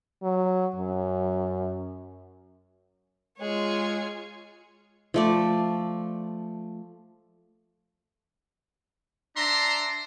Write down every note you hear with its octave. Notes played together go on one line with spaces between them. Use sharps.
F#3
F#2
G#3 F4 G#4 C#5
F3 A3 D5
D4 E5 A#5 C6